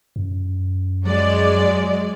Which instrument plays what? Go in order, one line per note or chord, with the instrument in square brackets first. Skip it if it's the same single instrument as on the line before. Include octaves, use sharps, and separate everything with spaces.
[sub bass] F#2
[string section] F#3 G#3 D5